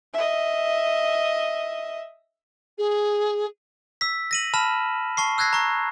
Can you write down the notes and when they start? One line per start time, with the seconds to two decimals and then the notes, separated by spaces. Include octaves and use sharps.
0.14 D#5 E5
2.78 G#4
4.01 E6 B6
4.31 A#6 D#7 F#7
4.54 A5 B5 F6 E7
5.17 A5 C#6 C7
5.38 E6 F#6 G#6 A#6 C7
5.53 A#5 C#6